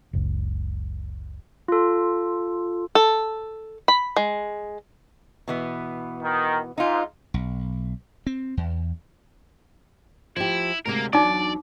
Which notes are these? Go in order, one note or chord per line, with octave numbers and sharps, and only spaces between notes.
F#1 C#2
F4 A4
A4
B5
G#3
B2 E3 B3
D#3
G#2 D#4 F4
B1
C4
E2
F3 E4 G4
D2 C3 G#3 A#3 A#4
E2 F#3 D4 D#4 D5 D6